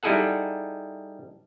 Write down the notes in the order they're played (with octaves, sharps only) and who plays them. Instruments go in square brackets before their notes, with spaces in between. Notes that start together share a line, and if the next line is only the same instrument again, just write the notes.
[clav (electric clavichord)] G3 D#4 E4 G#4 A4 F#5